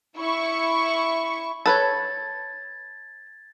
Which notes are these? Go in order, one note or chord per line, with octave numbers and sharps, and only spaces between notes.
E4 C#6
A4 B4 C#5 G#6 A6